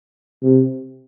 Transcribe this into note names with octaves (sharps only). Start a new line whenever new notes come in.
C3